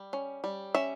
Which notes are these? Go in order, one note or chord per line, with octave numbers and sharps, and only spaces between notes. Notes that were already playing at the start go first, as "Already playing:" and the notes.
Already playing: G3
C#4
G3
C#4 E5